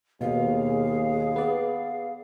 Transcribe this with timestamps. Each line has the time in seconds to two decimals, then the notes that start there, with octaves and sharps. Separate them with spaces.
0.21 D#2 B2 G#4 F5
1.36 B3 D5